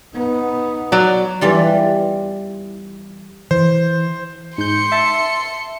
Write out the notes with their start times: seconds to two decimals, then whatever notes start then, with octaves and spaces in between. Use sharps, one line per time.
0.14 B3 D#4
0.92 F#3 D5
1.41 E2 E3 G3 F4
3.51 E3 C5
4.58 G#2 C6 G6 C#7
4.92 E5 A5